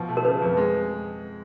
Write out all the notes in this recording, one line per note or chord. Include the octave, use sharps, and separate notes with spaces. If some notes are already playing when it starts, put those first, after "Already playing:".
Already playing: B2 F3
A3
A#4
C#3 B4
F2
G#3